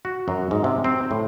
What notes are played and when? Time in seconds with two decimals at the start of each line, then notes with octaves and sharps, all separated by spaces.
0.05 F#4
0.28 F#2
0.51 G#2
0.64 C3
0.84 C4
1.11 A2